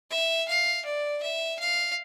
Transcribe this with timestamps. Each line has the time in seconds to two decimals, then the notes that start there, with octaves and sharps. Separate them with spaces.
0.11 E5
0.48 F5
0.85 D5
1.22 E5
1.59 F5